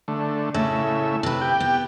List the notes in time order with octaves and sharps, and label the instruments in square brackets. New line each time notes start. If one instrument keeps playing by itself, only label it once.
[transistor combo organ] D3 A3
[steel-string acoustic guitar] A2 [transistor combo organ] C#3 A3 E5
[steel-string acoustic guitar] C3 B4
[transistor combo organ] G4 G5
[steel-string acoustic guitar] B3